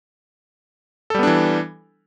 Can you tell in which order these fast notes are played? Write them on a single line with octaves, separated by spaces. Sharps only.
A4 G3 B3 D4 E3